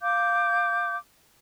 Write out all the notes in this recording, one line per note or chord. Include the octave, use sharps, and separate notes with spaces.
F5 D6 G6